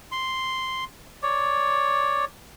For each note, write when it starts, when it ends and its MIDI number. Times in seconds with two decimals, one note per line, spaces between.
0.12 0.84 84
1.23 2.25 73
1.23 2.25 74